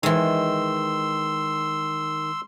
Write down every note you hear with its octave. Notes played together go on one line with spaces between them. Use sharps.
D#3 E3 G#3 C6 E6